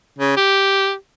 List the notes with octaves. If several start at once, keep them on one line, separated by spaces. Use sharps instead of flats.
C#3
G4